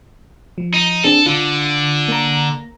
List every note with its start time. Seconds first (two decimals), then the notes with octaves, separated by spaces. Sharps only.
0.58 F3
0.74 D#4
1.04 C4 D4 G#4 A4
1.26 D3 F4
2.08 A#3 A#5